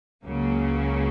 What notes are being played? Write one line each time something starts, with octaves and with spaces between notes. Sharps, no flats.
C#2 C#3 F#3 A#3